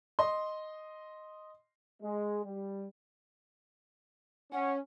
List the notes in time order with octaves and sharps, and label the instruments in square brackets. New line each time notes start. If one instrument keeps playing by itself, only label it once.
[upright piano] D#5 C6
[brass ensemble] G#3
G3
[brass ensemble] C#4 [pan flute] F#5